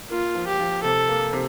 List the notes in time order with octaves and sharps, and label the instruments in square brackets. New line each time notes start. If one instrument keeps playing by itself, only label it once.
[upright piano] A#3 [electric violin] F4
[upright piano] F3
[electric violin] G4
[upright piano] F3
[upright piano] C3 [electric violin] A4
[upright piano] A#3
C3